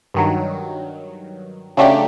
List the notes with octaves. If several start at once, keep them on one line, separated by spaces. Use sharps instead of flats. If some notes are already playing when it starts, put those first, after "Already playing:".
G2 D#3 F#3
C#3 F#3 A3 D4 G4